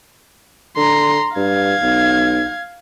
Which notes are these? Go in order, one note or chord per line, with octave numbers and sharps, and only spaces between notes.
D3 A#5 C6
G2 F5 G#6
B1